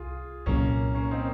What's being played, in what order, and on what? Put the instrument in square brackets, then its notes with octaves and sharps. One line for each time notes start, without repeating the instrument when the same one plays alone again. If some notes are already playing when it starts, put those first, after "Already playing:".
Already playing: [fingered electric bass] C2 [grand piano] F4 G#4
[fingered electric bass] C2 A#2 F#3 [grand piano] A#3 C#4
[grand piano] A#3 C#4
C4 D#4